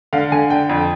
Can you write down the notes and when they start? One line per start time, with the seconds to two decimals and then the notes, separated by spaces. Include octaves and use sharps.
0.13 D3 F5
0.32 D3 G#5
0.50 D3 G5
0.69 F2